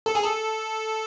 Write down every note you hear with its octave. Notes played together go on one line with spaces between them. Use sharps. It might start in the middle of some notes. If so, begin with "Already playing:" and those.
A4
G#4
A4